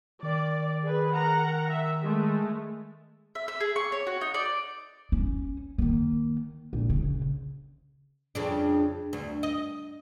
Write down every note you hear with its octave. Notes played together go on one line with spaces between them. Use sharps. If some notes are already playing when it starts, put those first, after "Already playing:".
D#3 D5
G#4 B4
A#4 F#5 A#5
E5
G#3 A3
E5
E5
G#4
C#6
C#5
F#4
D#4
D5
C#4
D#3 A#3
A#1
C#3
F2 C#3 D4
D2
D#5